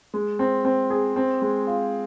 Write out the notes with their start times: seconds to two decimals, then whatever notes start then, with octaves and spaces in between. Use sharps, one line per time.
0.14 G#3
0.39 C4
0.65 C4
0.90 G#4
1.16 C4
1.42 G#3
1.67 F4